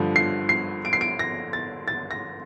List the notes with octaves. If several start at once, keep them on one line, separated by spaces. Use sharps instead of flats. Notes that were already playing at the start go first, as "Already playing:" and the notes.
Already playing: G2 D3 F3
C7
C7
D7
C7
D7
A#6
A6
A6
A#6